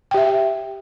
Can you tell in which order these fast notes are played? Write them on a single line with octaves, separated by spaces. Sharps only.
G5 G4 E5